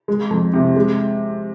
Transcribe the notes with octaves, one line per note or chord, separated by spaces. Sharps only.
G#3
F2
C3
G#3